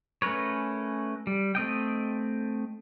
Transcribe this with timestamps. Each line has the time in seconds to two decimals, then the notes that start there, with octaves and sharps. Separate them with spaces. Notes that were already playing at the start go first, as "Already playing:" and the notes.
0.22 A3 C#4 A#4 B4 C#5
1.27 G3
1.55 A3 C4 D#5 G5